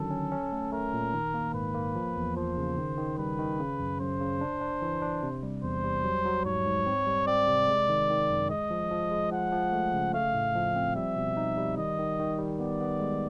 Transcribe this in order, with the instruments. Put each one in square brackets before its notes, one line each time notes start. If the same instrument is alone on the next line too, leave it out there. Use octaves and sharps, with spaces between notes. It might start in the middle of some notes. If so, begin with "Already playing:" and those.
Already playing: [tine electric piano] D3 D#3 F#3 C#4 [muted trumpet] A4
[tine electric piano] C#4
C#4
A3
[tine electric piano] A3 [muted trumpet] A#4
[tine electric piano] A#2
D#3
A#3
[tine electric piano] G#2 [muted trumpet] B4
[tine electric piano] A#3
F3
E2
[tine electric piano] F3 [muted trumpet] C5
[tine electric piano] C#3
D#3
D#3
[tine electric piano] G3 [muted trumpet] B4
[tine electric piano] D#3
C#3
F#2
[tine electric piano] F#2 [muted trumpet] C5
[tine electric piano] C#3
D4
D4
E3
D4
C3
G3
[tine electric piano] E2 [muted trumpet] C5
[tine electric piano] G3
F#3
F#3
[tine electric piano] G#2 [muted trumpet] C#5
[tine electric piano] G#2
C4
G3
[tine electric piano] C4 [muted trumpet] D5
[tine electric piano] C3
G#3
D#3
D#3
F#2
[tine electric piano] G#3 [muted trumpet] D#5
[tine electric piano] F3
F3
G#3
[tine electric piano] F3 [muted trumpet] F#5
[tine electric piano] F3
A3
C#3
[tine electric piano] A3 [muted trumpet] F5
[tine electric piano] A2
F3
C4
[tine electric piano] G3 [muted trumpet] E5
[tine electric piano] B2
D#4
G3
[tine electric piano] D#3 [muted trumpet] D#5
[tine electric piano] D#3
D#3
G3
[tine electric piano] B3 [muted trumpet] D5
[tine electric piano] B3
G#3